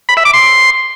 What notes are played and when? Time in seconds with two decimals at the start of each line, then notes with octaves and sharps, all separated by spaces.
0.09 B5
0.17 E5
0.25 D6
0.33 C6